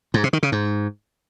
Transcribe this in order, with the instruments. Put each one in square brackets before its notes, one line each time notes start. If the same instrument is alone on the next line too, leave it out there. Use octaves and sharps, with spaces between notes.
[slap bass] G#2
C3
D#3
C#3
G#2